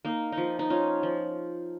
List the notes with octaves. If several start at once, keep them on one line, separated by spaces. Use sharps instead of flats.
A#3 D#4
D#4
F3
D#4
C#4 F4
F3